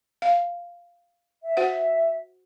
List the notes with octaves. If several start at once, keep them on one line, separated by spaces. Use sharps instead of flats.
F5
E5
F#4 C5 F#5